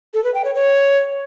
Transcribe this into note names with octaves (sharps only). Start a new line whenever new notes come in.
A4
B4
G5
C#5
C#5